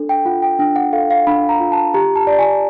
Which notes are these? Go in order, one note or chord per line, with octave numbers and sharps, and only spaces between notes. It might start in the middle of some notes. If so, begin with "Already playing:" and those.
Already playing: D4 A4
G5
F4 F#5
G5
D4 G5
F#5
A4 F5
F5
D4 B5
A#5
F4
A5
G4 A#5
A5
D5
G#5